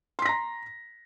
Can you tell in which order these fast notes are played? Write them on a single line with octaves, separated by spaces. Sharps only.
C6 B6 A#6 A#5